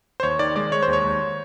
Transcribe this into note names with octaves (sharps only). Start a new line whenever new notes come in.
C5
D#2 C#5
D#3 D5
G#3 D5
G#3 C#5
C5
D#2
C#5
D#2